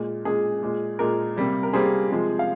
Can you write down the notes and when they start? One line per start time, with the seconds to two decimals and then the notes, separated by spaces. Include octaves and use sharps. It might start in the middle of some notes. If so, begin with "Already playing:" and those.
Already playing: A#2 G#3
0.25 A#2 G#3 G#4
0.63 A#2 G#3
0.99 A#2 G#3 A#4
1.36 C3 G3 A#3
1.63 A#4
1.73 C3 G3 A#3 G#4 C5
2.10 C3 F3 G#3
2.39 F5